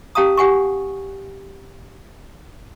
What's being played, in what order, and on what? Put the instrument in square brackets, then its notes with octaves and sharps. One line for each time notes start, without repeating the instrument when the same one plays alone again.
[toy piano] C#4 G4 F5 A5 A#5 D#6
G4 F#5 G#5 C#6